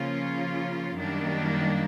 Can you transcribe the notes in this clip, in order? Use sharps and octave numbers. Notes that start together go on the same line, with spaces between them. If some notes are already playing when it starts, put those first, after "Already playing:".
Already playing: C#3 F3 A#3 C#4 F4
F#2 D#3 G3 A#3 D4